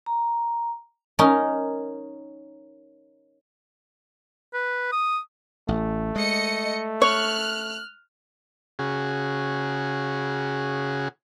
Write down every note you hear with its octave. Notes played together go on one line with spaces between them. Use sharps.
A#5
C#4 D#4 A#4
B4
D#6
A1 A3
G#3 D#5 C#7
C#5 F6 F#6
C#3 F#4 G#4